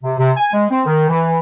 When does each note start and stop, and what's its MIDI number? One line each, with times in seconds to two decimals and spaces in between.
0.03 0.14 48
0.18 0.31 48
0.37 0.48 80
0.53 0.66 56
0.70 0.82 60
0.86 1.06 51
1.09 1.39 52